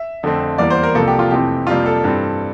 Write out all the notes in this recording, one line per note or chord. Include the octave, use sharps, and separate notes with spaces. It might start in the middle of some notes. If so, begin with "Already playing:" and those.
Already playing: E5
F2 D3 A3 C4
E2 E3 G3 A#3 D5
C5
A#4
C2 C3 F3 A#3 A4
G4
F4
F2 C3 E3 A3 C4 G4
F2 C3 G3 A#3 F4
A4
G2 E3 G3 C4